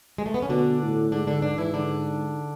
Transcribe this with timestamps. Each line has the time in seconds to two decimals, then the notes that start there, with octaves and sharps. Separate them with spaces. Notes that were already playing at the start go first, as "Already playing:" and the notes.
0.18 G#3
0.26 A3
0.34 B3
0.42 C#4
0.49 B2 D3 D4
0.81 A2
1.12 G#2 D3 D4
1.27 D3 D4
1.42 D3 D4
1.58 E3 E4
1.74 D3 D4